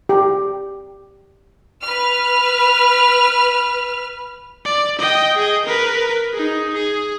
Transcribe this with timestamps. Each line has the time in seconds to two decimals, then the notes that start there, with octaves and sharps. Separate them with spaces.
0.09 G4
1.83 B4 F6
4.65 D5
4.99 D#5 G5
5.37 G#4 D#5
5.66 A#4 B4
6.33 D#4 G#4
6.74 G#4